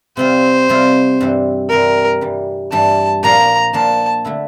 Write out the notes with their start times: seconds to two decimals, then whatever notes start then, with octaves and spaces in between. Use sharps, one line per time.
0.17 C3 G3 C4 F4 C5
0.69 C3 G3 C4 F4
1.20 G2 E3 G3 C4
1.70 G2 E3 G3 C4 A#4
2.21 G2 E3 G3
2.72 G2 E3 G3 A5
3.23 A#2 F3 A#3 D4 A#5
3.73 A#2 F3 A#3 D4 A5
4.25 D3 A3 E4